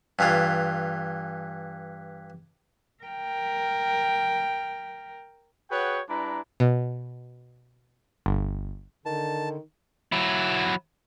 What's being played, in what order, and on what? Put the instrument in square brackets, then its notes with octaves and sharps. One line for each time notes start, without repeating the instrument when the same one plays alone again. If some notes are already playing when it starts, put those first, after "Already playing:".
[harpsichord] G2 E3 F4
[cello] A#4 G5
[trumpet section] F#4 G#4 B4 C#5 F#5 G5
G3 D4 E4 B4 A#5
[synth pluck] B2
G1
[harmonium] D3 [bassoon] D#3 [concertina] A5
[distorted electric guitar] F#3 E4